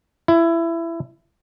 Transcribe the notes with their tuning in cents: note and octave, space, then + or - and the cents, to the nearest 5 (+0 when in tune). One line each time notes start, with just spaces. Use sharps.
E4 +20